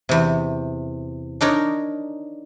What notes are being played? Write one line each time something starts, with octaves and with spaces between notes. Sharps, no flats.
E2 C3
D4 D#4 A#4 C#5